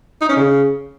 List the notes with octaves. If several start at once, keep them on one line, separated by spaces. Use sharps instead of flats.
D#4
C#4
C#3